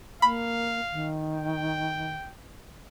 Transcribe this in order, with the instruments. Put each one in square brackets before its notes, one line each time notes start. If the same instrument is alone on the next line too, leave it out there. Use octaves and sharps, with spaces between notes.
[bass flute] A#3 [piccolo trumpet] F5 [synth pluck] B5
[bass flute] D#3
[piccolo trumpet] G5